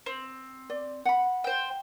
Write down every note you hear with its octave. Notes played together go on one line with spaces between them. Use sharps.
C4
D5
F#5 B5
C5 G5